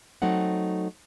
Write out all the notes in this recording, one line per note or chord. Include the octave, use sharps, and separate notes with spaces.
F#3 A3 C4 D#4 F#5